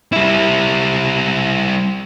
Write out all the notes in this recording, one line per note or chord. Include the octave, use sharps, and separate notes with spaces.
G3 E4